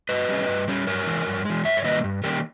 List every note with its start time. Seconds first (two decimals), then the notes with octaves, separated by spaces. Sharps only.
0.09 G2 B4 D#5
0.28 G3 C#4
0.48 G2
0.68 G3 C#4
0.87 G2 A#4 C#5
1.06 E3 G#3
1.26 G2
1.45 E3 G#3
1.65 G2 C#5 E5
1.77 C#5
1.84 D#3 G3 A#3 B4 D#5
2.04 G2
2.24 D#3 G3 A#3 C#4 G4 A#4